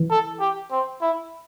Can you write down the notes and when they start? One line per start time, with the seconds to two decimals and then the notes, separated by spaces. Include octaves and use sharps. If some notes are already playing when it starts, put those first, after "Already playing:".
Already playing: E3
0.10 A4
0.40 G4
0.71 C4
1.01 E4